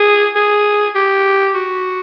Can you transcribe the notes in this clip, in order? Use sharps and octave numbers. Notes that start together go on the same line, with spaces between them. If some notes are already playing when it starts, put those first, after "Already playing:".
Already playing: G#4
G#4
G4
F#4